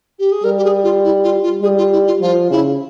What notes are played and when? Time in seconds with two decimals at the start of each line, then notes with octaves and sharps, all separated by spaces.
0.18 G4
0.31 G#4
0.44 G3 A#4
0.57 G4
0.64 G#4
0.83 F4
1.03 E4
1.23 F4
1.42 F4
1.62 G3 G#4
1.77 F4
1.92 E4
2.06 F4
2.21 F3 F4
2.50 C#3 E4